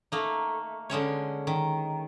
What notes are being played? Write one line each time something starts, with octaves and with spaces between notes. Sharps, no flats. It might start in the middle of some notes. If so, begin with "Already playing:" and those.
A3 A#3 D#4
D3 G#3 C#4 C#5
D#3